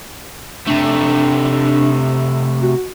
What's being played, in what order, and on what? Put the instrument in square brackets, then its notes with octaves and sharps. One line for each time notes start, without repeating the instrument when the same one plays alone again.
[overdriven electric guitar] C3 A3 [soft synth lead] D4
[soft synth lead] F#4